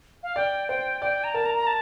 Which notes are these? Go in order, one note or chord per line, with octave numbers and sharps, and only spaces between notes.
F5
D5 G5
C5 G5
D5 G5
A#5
A#4 A5
A#5
A#5
A5